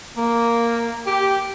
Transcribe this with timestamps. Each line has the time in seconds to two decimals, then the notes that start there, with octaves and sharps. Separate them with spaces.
0.17 A#3
1.07 G4